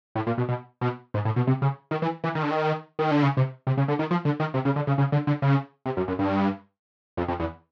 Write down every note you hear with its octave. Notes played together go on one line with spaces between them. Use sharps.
A2
A#2
B2
B2
B2
G#2
A2
B2
C3
C#3
D#3
E3
E3
D#3
D3
D#3
D#3
D3
C#3
C3
C3
C#3
D3
D#3
F3
D3
D#3
C3
C#3
D3
C#3
C#3
D3
D3
C#3
C3
F#2
F#2
G2
F2
F2
E2